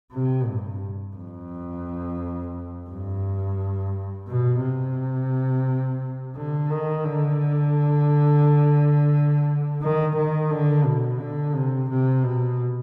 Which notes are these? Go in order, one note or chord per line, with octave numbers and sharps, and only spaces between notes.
C3
G2
F2
G2
B2
C3
D3
D#3
D3
D#3
D#3
D3
B2
D3
C3
C3
B2